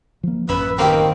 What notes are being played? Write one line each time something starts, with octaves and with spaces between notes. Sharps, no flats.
F3 A#3
A1 F#2 C#4 B4 E5 B5
D#3 A#3 C4 G5